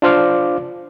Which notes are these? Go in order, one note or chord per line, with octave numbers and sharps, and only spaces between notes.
D4 F4 C5 F5 D6